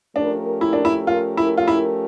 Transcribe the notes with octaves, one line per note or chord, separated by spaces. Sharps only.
F3 A3 C#4 D4 G4 A#4
E4
D4
E4
F4
E4
F4
E4